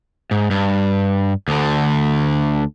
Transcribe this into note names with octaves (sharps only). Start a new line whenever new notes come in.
G#2
G2
D2 D3